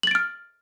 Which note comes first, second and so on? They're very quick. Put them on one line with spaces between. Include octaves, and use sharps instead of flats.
F#7 A6 D7 F6